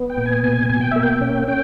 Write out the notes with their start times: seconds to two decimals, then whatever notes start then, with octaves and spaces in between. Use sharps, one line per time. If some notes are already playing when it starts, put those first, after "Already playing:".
Already playing: B3
0.10 G5
0.18 A#2
0.26 G#5
0.43 B2 G#5
0.69 B2 G#5
0.81 G5
0.91 A#3 E5
1.03 G5
1.21 C#4
1.48 C#4 G5